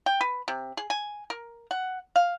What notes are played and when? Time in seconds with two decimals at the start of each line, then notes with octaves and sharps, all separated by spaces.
0.06 G5
0.21 B4
0.48 C3
0.77 G#4
0.90 G#5
1.30 A#4
1.71 F#5
2.16 F5